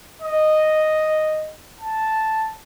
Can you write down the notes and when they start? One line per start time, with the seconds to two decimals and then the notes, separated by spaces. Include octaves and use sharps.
0.22 D#5
1.81 A5